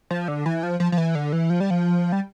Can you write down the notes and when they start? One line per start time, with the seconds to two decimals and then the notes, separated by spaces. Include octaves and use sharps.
0.11 F3
0.28 D3
0.46 E3
0.63 F3
0.80 F3
0.92 F3
0.98 E3
1.15 D3
1.33 E3
1.50 F3
1.60 G3
1.70 F3
2.12 G3